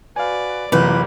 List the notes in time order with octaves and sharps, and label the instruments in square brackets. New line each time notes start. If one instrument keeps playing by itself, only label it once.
[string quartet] F#4 B4 D5 [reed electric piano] F5 G#5
[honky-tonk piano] F#1 [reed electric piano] C3 E3 F4 [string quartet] G3 A#3 A#4 [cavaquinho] B4